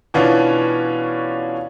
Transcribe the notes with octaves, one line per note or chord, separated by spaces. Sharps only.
B2 E3 C#4 D4 F4